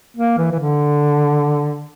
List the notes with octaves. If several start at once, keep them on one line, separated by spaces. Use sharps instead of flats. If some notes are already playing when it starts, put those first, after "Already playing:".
A#3
E3
E3
D3